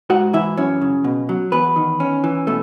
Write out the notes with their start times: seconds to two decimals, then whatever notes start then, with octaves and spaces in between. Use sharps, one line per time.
0.10 G#2 F#4 F#5
0.33 E3 E4 E5
0.57 F#2 C#4 C#5
0.81 C#3
1.04 B2
1.29 F#3
1.52 E2 B3 B4
1.76 D#3
2.00 C#4
2.24 E3
2.47 B2 A3